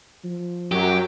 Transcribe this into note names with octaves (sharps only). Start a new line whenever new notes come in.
F3
F#2 F#3 G4